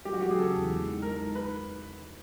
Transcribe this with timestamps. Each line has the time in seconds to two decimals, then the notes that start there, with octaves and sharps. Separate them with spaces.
0.05 F#3 G4
0.13 F#4
0.22 F#3 G4
0.30 G#4
0.38 C#3 A4
0.55 E2
0.71 G#3
0.87 D#4
1.02 G#3 A#4
1.19 D#4
1.35 B4